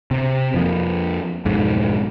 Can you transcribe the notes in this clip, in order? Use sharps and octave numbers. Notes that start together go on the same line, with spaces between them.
C3
F2 F3 A#3
B1 F2 G#2